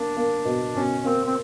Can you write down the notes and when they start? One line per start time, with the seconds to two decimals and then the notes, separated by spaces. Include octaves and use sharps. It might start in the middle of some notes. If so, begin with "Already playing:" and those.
Already playing: A#3 D4
0.17 A#3
0.45 B2
0.75 B2 C#4
1.05 A#3 C4
1.26 C4